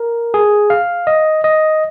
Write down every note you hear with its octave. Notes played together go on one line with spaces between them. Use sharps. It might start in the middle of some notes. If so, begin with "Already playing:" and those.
Already playing: A#4
G#4
F5
D#5
D#5